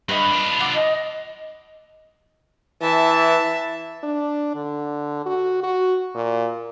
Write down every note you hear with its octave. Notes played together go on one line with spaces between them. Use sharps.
G2 B4 D#5
D4 F4
F#5 D6
D#5
E3 E5 A5
D4
D3
F#4
F#4
A#2